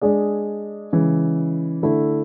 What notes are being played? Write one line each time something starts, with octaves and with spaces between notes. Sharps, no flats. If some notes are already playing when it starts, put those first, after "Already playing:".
G#3 D4 G#4 D5
C#3 E3 G#3
D3 A3 E4